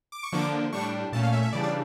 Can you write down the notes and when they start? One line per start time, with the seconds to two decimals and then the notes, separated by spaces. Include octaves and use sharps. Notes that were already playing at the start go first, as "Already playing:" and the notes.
0.12 D6
0.23 C#6
0.32 D3 F3 A#3 D4 D6
0.72 A2 G3 D4 C#6
1.12 A#2 A3 C#4 A5
1.23 F5
1.33 E5
1.43 E5
1.53 C#3 E3 G3 D4 D5
1.63 D5